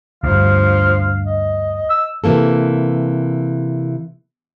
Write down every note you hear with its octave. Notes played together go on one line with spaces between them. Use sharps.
D2 G2 F3 F5
D#5
E6
C3 E3 A#3 A4